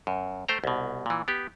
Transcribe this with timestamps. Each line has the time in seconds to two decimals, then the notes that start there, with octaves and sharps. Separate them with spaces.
0.07 F#2
0.48 A3 C5 G5 A#5
0.64 C2 B2
1.06 A#2 E3
1.28 B3 G4